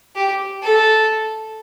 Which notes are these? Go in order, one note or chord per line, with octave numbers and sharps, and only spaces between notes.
G4
A4